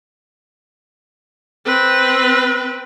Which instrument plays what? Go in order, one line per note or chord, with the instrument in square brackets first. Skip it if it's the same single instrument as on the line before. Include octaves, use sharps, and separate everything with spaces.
[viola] C4 B4